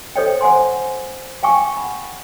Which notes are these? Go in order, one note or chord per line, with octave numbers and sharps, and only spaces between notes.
A4 C5 C#5 D#5 G5
C5 F#5 G#5 C6
F5 G5 G#5 C#6 D6
F#5 B5